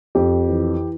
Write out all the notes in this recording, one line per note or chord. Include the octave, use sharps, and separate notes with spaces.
F2 G4
E3